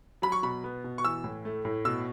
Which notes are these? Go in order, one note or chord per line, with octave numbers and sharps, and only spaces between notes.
F#3 B5
C#6
B2 B5
B3
B2
C#6
E3 E6
A2
A3
A2
B2 E6